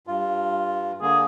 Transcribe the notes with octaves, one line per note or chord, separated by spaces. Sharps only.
G2 F4
D3 A#3 G#4